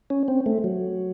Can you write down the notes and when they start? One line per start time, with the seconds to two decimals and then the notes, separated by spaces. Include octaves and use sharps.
0.10 C#4
0.28 C4
0.46 A3
0.64 F#3